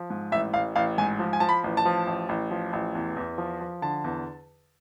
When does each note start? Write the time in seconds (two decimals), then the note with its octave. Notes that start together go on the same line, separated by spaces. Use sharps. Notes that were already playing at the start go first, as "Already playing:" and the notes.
Already playing: F3
0.10 G#2
0.32 A1 E5
0.53 A1 F5
0.76 A1 F5
0.98 G#2 G#5
1.19 F3
1.33 G#5
1.40 F3 A5
1.49 B5
1.64 A1
1.77 A5
1.85 F3
2.07 A1
2.29 A1
2.51 F3
2.73 A1
2.95 E2
3.17 E2
3.38 F3
3.61 F3
3.82 D3 A5
4.04 E2